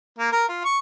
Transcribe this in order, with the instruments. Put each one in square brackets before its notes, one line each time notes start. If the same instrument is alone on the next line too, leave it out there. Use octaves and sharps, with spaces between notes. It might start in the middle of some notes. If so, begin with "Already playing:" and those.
[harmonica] A#3
A#4
F4
C#6